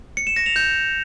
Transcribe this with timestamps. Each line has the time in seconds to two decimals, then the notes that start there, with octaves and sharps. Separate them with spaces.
0.17 C#7
0.27 E7
0.36 A#6
0.46 F7
0.56 G6